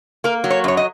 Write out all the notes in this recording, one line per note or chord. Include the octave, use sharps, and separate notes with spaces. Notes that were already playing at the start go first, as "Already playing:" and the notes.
A#3 A#4
F#3
C#5
F#2 C#5
D#5